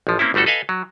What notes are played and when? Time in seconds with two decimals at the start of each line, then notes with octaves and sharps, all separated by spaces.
0.07 A1 F3
0.19 A#3 C4 C#4 E4
0.34 G1 G3 A3 F#4 A4
0.46 A4 B4 D#5 F5 G#5
0.69 F#3